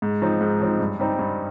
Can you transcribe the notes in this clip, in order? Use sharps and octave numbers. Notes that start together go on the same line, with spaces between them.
G#2
F3 C4 D#4
G#2
F3 C4 D#4
G2
G3 C4 D#4
G2